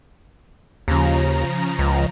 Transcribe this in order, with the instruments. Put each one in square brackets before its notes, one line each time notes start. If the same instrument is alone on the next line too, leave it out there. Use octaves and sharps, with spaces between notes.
[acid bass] D#2 [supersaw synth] C#3 F3 A#5
[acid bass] C#2